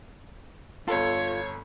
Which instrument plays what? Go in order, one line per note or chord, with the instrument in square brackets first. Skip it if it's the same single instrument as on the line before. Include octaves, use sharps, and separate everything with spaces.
[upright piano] G1 A4 [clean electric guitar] F4 [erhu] C#5